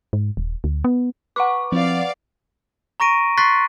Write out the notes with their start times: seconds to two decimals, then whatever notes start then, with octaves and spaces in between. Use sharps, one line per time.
0.13 G#2
0.37 D#1
0.64 D2
0.84 B3
1.36 B4 F#5 C#6 D6
1.72 F3 C4 E4 D5 F5
3.00 A#5 C#6 A#6 D7 D#7
3.37 C6 C#6 F#6 A6 B6 C7